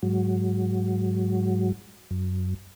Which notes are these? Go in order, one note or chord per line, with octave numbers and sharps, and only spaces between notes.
G#2 F#3
F#2